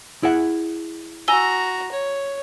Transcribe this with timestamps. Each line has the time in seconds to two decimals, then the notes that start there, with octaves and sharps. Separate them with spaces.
0.23 E4 G#4 F#5
1.28 F#4 G#5 A#5 E6 G7
1.91 C#5